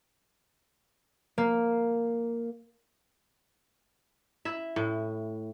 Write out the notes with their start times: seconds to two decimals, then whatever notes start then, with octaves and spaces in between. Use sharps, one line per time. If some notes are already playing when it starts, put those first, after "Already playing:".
1.38 A#3
4.45 E4 E5
4.76 A2